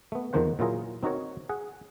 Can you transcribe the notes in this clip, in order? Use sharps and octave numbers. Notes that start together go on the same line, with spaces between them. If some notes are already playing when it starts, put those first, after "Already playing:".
A3 B3
E2 D#3 F3 A#3 C5 F#5
A#2 F#3 E4 F4 G#4 A#4
C4 D#4 F#4 A#4 C#5
G#4 F#5